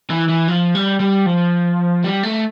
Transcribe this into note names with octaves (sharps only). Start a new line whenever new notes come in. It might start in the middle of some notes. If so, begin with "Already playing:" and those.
E3
E3
F3
G3
G3
F3
G3
A3